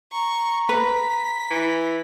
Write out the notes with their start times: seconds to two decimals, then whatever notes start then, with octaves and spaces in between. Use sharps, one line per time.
0.12 A#5 C#6
0.69 B4 B6
1.51 E3